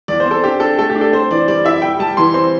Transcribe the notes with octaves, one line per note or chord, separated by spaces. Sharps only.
E2 D5
C5
C4
A4
D4 G4
D4 A4
A3 A4
G4
D4
A4
C4 C5
E3 D5
G3 D5
E4 E5
G3 G5
G3 A5
E3 C6
C4 C6